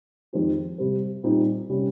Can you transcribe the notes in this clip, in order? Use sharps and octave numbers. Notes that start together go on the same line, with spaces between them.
F2 D#3 G#3 C4 G4
C3 G3 C4
A#2 G3 C4 D#4 G4
C3 G3 C#4